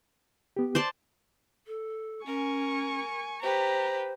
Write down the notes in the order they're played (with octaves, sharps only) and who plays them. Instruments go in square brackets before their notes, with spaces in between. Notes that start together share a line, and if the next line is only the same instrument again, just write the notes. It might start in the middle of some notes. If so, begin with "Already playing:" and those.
[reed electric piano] B3 G4
[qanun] C5 D5 A5
[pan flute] A4
[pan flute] C#4 [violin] A#4 [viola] G#5 C#6
[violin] G4 B4 [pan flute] C5 [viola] A#5